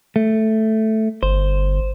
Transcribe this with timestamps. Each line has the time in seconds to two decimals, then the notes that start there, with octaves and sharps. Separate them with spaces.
0.16 A3
1.23 G1 C5